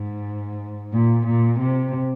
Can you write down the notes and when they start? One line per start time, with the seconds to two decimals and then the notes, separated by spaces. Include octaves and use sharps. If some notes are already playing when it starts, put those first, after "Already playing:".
Already playing: G#2
0.93 A#2
1.26 A#2
1.59 C3